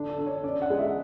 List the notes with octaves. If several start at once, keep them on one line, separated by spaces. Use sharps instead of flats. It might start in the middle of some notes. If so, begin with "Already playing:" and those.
Already playing: D3 D4
A4
D4
C#5
C#4 D5
F#5
G#3
E5